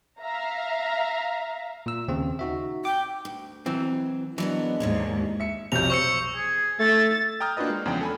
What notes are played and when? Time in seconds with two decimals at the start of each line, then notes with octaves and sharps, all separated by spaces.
0.21 E5 F5 A#5
1.86 A#2 E6
2.08 D#2 C#3 C4
2.39 D#4 F#4 E5
2.85 G5 D6
3.25 D2
3.66 E3 F#3 C4
4.38 E3 F#3 G#3 B3 D4 A#4 D#5
4.80 D#2 G#2 D3 A#3 C#5
5.40 E5 C#7
5.72 B1 F2 C3 G6 F7
5.90 C5 C#6 E6 C#7
6.36 G#4
6.80 A3 E5 A6
7.40 G5 A#5 D#6 F6 G6
7.57 A#3 D4 F4 F#4 B4 D#5
7.70 G#3
7.86 E2 C#3 F3 D4 G5
8.01 A4 G#5 B5